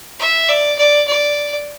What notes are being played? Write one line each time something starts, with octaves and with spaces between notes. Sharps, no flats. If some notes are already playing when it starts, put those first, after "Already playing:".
E5
D5
D5
D5